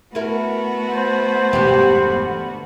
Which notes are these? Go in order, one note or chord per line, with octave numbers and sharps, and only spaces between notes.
A3 B3 E4 F#4 A#4
C5
E1 G2 D3 G4